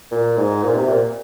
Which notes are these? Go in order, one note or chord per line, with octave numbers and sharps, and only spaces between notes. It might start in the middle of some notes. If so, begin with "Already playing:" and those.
A#2
G#2
A#2
C3
A#2